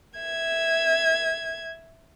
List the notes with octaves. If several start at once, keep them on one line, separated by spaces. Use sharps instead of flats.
E5 G#6